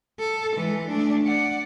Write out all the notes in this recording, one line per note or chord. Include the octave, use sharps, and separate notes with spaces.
A4
E3 G#3
A3 D4
D5 F#5